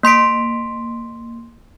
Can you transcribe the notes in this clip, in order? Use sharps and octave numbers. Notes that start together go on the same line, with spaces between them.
A#3 C6 B6 D7